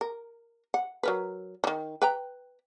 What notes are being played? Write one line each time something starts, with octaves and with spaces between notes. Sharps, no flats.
A#4
F#5
F#3 A#4 B4
D#3 E3
B4 G5 A#5